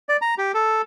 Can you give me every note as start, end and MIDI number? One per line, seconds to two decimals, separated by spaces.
0.09 0.17 74
0.22 0.35 82
0.38 0.52 67
0.54 0.82 69